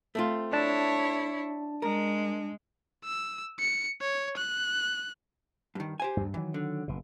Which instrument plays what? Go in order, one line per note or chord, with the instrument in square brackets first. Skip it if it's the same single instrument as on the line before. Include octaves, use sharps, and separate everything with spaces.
[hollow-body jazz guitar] A3 C4 F4
[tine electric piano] D4 A5 [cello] E4 C#5
[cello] G#3 [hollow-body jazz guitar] A#4
[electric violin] E6
C#7
C#5
F#6
[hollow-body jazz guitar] G2 D#3
G4 C5 G#5
[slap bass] D2 G2
[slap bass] D#3 F#3 [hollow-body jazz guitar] E3
[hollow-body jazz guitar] D3
[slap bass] F#1 B2